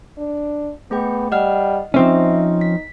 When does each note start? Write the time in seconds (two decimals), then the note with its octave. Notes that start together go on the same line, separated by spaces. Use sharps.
0.18 D4
0.91 A3 B3 G#4 G5
1.32 G3 D#5 F#5 F6
1.94 F3 C4 C#4 D#4 E5
2.61 B6